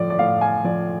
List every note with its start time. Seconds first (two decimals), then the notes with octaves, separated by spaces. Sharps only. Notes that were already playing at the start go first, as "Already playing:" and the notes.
Already playing: A2 F3 D5
0.10 D5
0.19 A2 F5
0.41 F5 G#5
0.64 F3 D5